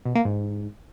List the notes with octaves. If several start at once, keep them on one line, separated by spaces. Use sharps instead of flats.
B2
A#3
G#2